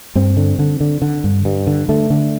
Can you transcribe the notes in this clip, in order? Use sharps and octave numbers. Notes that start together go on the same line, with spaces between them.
G2 C4
D3
D3
D3
D3
G2
G2
D3
D3 A3
D3